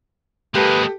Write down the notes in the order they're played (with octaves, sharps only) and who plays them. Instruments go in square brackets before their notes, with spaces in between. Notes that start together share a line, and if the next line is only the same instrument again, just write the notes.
[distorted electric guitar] G#3 A#3 [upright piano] G4 A4 [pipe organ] B4 D#6